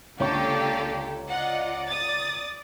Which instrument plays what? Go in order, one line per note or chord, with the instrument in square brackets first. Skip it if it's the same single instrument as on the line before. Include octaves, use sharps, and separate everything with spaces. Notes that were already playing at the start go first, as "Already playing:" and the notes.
[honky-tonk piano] C#2 C#5 C#6 [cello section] D3 A#3 D5 [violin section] G4 A4
[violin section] F4 D#5 F#5 [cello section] D5
[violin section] D#6 A6